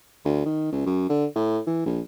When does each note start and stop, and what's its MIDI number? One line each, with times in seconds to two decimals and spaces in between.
0.25 0.43 38
0.46 0.70 51
0.72 0.85 37
0.86 1.08 42
1.09 1.25 50
1.35 1.59 45
1.66 1.83 52
1.86 2.00 34